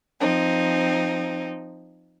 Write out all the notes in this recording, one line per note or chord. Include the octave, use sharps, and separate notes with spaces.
F3 C4 D#4